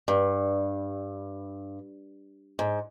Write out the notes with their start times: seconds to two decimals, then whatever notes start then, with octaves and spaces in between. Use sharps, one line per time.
0.08 G2
2.59 G#2